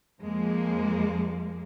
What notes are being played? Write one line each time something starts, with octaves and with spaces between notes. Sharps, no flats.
F2 F3 G#3 A#3